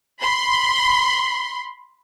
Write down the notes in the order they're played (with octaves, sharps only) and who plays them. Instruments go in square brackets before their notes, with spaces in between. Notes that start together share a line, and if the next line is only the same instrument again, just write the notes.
[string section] B5 C6